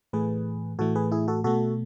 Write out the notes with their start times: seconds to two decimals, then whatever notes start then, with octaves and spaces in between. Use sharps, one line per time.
0.13 A2 E3 A3 G#4 B4
0.79 A2 E3 A3 F#4 A4
0.95 G#4 B4
1.12 E4 G#4
1.28 F#4 A4
1.44 B2 A3 F#4 A4